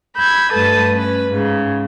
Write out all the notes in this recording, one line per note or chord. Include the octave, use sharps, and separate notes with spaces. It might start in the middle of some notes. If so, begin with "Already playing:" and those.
B5 E6 G6 G#6
G2 A3 A4 B4 A5 D#6
C#4 B4
G#2 C#3